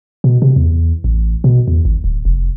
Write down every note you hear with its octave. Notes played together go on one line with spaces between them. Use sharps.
B2
C3
E2
A1
B2
E2
G#1
D1
F1